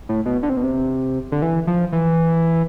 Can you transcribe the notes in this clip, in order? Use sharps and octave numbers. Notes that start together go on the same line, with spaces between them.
A2
B2
D3
C3
B2
C3
D3
E3
F3
E3